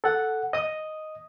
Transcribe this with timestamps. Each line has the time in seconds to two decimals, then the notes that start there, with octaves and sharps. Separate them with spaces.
0.04 A4 F#5
0.53 D#5 D#6